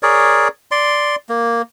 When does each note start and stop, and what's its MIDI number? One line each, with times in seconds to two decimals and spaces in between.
0.03 0.48 68
0.03 0.48 70
0.03 0.48 73
0.03 0.48 74
0.71 1.16 74
0.71 1.16 84
1.29 1.62 58